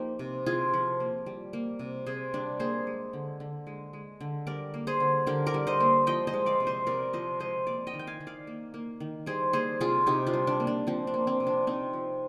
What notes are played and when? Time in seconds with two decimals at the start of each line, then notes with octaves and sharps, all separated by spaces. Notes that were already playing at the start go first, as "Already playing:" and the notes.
Already playing: F3 A#3 D#4 G4
0.19 C3
0.46 C3 F4 G#4
0.74 F3
1.00 A#3
1.26 G3
1.53 A#3
1.79 C3
2.06 C3 G#4 C5
2.34 G3 D4
2.59 A#3 G#4 C5
2.87 G#3
3.13 D3
3.40 D3
3.67 G#3
3.93 G#3
4.21 D3
4.47 G3 A#4 D5
4.74 A#3
4.87 G#4 C5
5.00 D3
5.27 D3 G4 A#4
5.46 A#4 D5
5.54 G3
5.67 C5 D#5
5.80 A#3
6.07 F3 D#5 G5
6.27 C5 D#5
6.34 G#3
6.46 D5 F5
6.60 C3
6.67 C5 D#5
6.87 C3 A#4 D5
7.13 F3 C5 D#5
7.40 G#3 C5 D#5
7.67 A#3 D5 F5
7.87 D#5 G5
7.94 D#3
7.99 G5
8.07 F5 G#5
8.20 D#3
8.27 D5 F5
8.47 A#3
8.74 A#3
9.00 D#3
9.26 G3 G#4 C5
9.53 A#3 G#4 C5
9.80 C3 F4 G#4
10.06 C3 D#4 G4
10.27 D4 F4
10.34 G3
10.47 D4
10.60 A#3
10.67 D4
10.87 F3 C4
11.07 D4
11.14 A#3
11.27 C4
11.40 C3
11.47 D4
11.67 C3 C4 D#4
11.93 F3